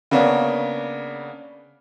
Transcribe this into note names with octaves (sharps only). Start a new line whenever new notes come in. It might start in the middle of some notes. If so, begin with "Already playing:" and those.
C#3 A#3 B3 C#4 D4